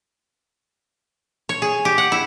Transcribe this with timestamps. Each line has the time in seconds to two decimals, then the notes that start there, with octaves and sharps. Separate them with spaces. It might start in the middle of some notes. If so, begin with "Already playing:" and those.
1.49 C#5
1.62 G#4
1.85 G4
1.98 F#5
2.12 E4